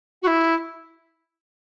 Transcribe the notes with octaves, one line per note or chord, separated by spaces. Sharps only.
F#4
E4